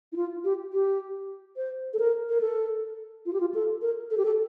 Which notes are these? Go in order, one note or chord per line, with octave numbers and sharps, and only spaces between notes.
E4
F4
G4
G4
C5
A4
A#4
A#4
A4
F4
G4
F4
A4
A#4
A4
G4
A4